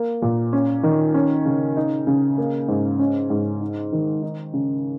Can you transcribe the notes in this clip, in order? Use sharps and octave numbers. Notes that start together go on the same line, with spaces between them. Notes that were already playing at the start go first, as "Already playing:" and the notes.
Already playing: A#3
A#2
C#4
D#3
C#4
C#3
D#4
C#3
A#3
G#2
C#4
G#2
D#4
D#3
D#4
C#3